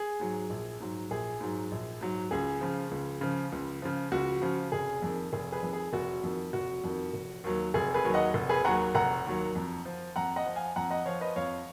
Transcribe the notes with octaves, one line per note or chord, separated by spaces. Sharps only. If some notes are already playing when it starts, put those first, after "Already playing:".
Already playing: G#4
G#2 F#3
A#1
G#2 F#3
A#1 G#4
G#2 F#3
A#1
G#2 F#3
C#2 G#4
C#3 F3
C#2
C#3 F3
C#2
C#3 F3
C#2 F#4
C#3 F3
F1 G#4
F2 D#3
F1 G#4
G#4 B4
F2 D#3
G#4
F1 F#4
F2 D#3
F1 F#4
F2 D#3
F1
D#2 D#3 F#3
F1 G#4
G#4 B4
D#2 D#3 F#3
D#5 F#5
F1
G#4 B4
D#2 D#3 F#3 F#5 A#5
F1 F#5 A#5
D#2 D#3 F#3
F2
F3
F2 F#5 A#5
D#5 F#5
F3
F5 G#5
F2 F#5 A#5
D#5 F#5
F3 C#5 F5
B4 D#5
F2 C#5 F5